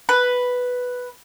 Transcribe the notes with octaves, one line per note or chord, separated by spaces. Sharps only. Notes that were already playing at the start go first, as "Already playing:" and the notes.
B4